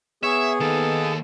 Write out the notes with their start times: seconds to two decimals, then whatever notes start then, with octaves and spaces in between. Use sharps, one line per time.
0.23 B3 G#4 C#5 E5
0.61 D#3 A#3 A4